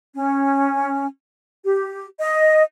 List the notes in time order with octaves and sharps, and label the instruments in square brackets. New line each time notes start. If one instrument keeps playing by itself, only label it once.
[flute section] C#4
G4
D#5